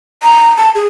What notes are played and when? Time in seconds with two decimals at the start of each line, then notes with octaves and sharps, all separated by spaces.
0.23 A#5
0.57 A5
0.75 G#4